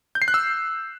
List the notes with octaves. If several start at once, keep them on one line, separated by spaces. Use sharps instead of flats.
G6
C7
F#6
E6